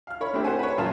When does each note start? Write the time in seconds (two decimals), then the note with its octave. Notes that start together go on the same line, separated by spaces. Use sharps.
0.07 F5 F6
0.21 A#4 C#5 B5
0.33 A3 A#3 C4 D4 E4 G4
0.44 A#4 C5 F#5 G#5
0.59 B4 C#5
0.78 F#2 A#2 F4 F5 A5 A#5